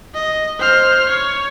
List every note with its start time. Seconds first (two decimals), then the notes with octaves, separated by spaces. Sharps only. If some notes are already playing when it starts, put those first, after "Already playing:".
0.14 D#5
0.59 C5 F6
1.09 C#5